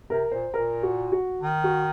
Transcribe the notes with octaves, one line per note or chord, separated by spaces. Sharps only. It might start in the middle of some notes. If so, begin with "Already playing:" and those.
C3 A#4
A#2 C5
A#2 A#4
F#4
F#4
D#3
F#4